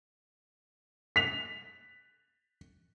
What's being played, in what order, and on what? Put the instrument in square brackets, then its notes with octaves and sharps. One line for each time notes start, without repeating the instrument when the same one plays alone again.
[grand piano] B6 F7